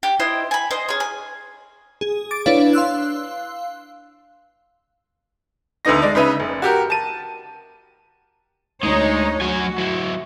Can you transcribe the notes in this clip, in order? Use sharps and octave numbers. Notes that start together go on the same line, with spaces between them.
G4
E4 C5 D#5
G#5 B5
C5 D#5
C#4 G#4
G#5
G#4
D6 A6 D7
D4 E4 B4 C#5 D5 F5
F5 C6 E6 F#6
D2 D3 B3 D#4 A#6
G#3 D5
C#3 D#4 B4 E5
F#1
F#4 G4 A#4
A5 D#7
D2 G#3 D#4 C#5
F#3 F#4 G#5
F#3 E4